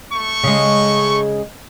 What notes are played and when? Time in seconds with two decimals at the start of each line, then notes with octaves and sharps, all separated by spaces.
0.13 A3 C#6
0.43 C#3 G#3